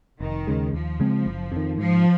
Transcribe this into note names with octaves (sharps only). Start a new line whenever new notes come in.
F1 D#3
D#2 C#3 G#3
D#2 F3
C#3 G#3 C4
F#1
F2 D#3
G#2 F3